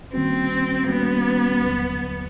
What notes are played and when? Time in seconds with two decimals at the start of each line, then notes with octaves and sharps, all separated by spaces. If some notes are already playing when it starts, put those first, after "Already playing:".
0.12 D#3 G3 A#3 C4 C#4 F#4
0.88 D#3 G3 A#3 B3 C#4 F#4
1.64 D#2 D3 F#3